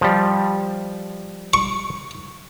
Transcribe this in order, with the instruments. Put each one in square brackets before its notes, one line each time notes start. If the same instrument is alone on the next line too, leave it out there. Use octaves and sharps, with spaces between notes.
[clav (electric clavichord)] F3 G3
[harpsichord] C#6